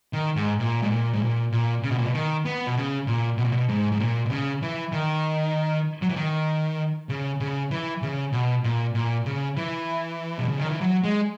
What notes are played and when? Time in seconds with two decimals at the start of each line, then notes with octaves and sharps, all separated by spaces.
0.13 D#3
0.36 G#2
0.60 A#2
0.82 G#2
0.90 A#2
1.13 G#2
1.22 A#2
1.52 A#2
1.83 C#3
1.91 B2
1.98 A#2
2.06 B2
2.14 D#3
2.45 B3
2.67 B2
2.76 C#3
3.07 A#2
3.38 B2
3.45 A#2
3.52 B2
3.69 G#2
3.92 G#2
4.00 A#2
4.26 B2
4.31 C#3
4.62 E3
4.92 D#3
6.02 F#3
6.09 E3
6.16 D#3
7.09 C#3
7.40 C#3
7.71 E3
8.02 C#3
8.32 B2
8.64 A#2
8.95 A#2
9.26 C#3
9.57 E3
10.38 B2
10.49 C#3
10.59 D#3
10.70 E3
10.81 F#3
11.04 G#3